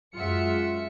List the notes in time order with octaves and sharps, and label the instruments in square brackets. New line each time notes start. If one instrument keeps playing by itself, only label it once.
[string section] F#2 G#3 F4 E5 F#5 C#7